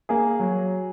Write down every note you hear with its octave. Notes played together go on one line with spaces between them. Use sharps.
A#3 G#4
F#3